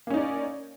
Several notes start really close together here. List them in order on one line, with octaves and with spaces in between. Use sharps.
A#3 C#4 D#4 D5